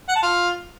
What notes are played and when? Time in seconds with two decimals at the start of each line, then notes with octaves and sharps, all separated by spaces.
0.09 F#5
0.16 A5
0.23 F4